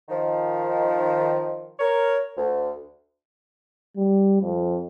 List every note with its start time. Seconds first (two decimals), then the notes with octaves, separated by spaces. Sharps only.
0.09 D#3 F3
1.79 A#4 C#5
2.37 D2
3.97 G3
4.42 F2